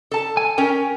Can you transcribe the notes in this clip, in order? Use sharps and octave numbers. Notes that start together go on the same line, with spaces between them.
A4 A5
G#5
C#4 A#4 G5